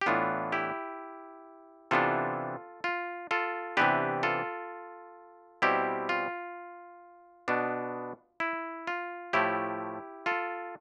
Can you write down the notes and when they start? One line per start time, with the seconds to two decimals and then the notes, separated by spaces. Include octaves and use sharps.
0.01 G4
0.06 A2 E3 B3 D4 F4
0.52 E4 G4
1.91 C3 E3 B3 D4 F4 A4
2.84 F4
3.31 F4 A4
3.77 C3 E3 B3 D4 G4 B4
4.23 F4 A4
5.62 B2 G3 C4 E4 G4
6.09 F4
7.48 B2 B3 D4
8.40 E4
8.87 F4
9.33 A2 F3 A3 E4 G4
10.26 F4 A4